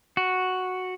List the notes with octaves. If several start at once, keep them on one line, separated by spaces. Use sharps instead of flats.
F#4